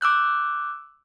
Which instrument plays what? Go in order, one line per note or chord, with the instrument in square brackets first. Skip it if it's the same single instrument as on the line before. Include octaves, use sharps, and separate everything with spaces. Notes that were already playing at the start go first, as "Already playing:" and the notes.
[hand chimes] D6 E6 F#6 G6